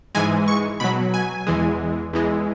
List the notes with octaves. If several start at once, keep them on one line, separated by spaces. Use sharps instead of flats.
G#2 E3 G#3 G#5
C#6
B2 F#3 B5
G#5
E2 E3 G#3
E2 E3 G#3